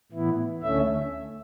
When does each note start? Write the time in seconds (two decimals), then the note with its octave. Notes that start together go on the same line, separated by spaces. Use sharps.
0.12 A2 E3 B3 E4
0.63 D2 D3 A3 C#4 E5